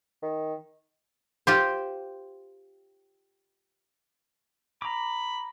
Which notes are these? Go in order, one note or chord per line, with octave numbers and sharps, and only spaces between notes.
D#3
F4 G4 C5
A#5 B5 D6